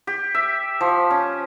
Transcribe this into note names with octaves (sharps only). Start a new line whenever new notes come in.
G4
E5
F3
C#4